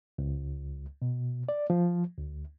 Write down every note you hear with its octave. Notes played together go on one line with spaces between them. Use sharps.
C#2
B2
D5
F3
D2